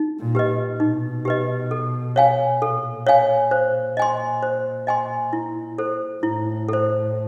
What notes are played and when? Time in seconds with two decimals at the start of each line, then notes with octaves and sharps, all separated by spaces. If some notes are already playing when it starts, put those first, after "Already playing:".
Already playing: D#4
0.20 A#2
0.35 G4 B4 D#5
0.80 B2 D#4
1.25 G4 B4 D#5
1.71 A4
2.16 C#5 F5 G#5
2.62 A#2 A4
3.06 C#5 F5 G#5
3.51 C5
3.97 D#5 G#5 C6
4.43 C5
4.87 D#5 G#5 C6
5.33 E4
5.78 A4 C5
6.23 A2 E4
6.69 A4 C5